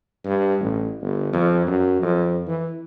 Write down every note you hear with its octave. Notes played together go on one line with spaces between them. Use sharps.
G2
A1
G1
F2
F#2
F2
E3